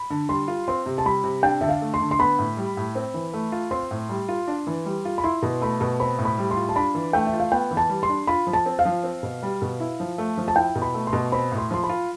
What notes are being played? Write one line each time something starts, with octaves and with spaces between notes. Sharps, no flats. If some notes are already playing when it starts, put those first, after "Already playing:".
Already playing: B5
D3
G3 C6
F4
C4 C6
C3
A5
G3 B5
C3
D4 G5
D3 E5
F5
A3
C6
D3
C6
B3 B5
A2
G3
A2
C4
E3
A3
F4
C4 C6
A2
G3
F4
D4
E3
G3
F4
B5
E4 C6
B2
A3 B5
B2
C4 B5
A2
B5
G3
C6
F4
A5
D4 B5
E3
A3 G5
E5
F4
F5
B3 G5
E3
A5
G3
C6
D4
F4 B5
F3
A5
C4
F5
F3
C4
B2
G3
B2
E4
F3
A3
F3
A5
E4 G5
B2
B5
A3
C6
B2
C4 B5
A2
C6
F3 C6
B5
F4